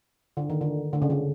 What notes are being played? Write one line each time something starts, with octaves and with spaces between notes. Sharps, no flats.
D3
D#3
D3
D3
C#3
D3